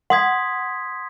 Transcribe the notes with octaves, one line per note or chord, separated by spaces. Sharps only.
F#5 C6 D#6 G#6 B6